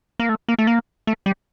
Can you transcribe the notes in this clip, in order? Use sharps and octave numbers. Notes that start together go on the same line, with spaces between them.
A#3
A3
A#3
A3
A#3
A3
G3